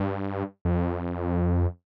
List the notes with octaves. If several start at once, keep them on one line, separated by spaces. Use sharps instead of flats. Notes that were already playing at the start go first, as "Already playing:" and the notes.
Already playing: G2
F2